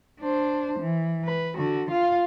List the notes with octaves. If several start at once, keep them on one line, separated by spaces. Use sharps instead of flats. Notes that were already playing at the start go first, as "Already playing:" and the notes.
D4 C5
E3
B4
D3 F#4
F4 F5